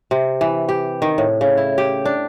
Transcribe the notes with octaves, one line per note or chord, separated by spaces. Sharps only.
C3
E3
G4
D#3
A2
C#3
E4
G4
D4